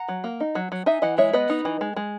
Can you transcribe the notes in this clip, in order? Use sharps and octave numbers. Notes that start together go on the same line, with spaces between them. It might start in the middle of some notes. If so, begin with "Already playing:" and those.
Already playing: F#5 A#5
F#3
A#3
D#4
F#3
F#3
D#4 E5 G#5
E3 D#5 F#5
G#3 C#5 E5
B3 B4 D#5
D#4
E3
G#3
G#3